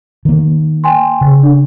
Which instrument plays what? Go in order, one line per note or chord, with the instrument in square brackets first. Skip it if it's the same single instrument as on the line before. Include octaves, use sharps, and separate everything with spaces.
[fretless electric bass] D#3 A#3
[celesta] G5 G#5 C6
[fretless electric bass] C#3
[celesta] D4